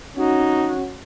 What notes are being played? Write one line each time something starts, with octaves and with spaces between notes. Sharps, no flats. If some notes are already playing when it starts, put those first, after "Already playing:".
C#4 D#4 F#4